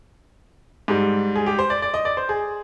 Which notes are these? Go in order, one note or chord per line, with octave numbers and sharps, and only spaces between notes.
G#2 G3
G#4
G4
C5
D5
D5
D#5
D5
C5
G#4